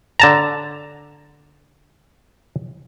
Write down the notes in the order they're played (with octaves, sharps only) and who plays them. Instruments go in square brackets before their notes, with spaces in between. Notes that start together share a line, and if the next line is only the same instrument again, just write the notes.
[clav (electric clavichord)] D3 A5 A#5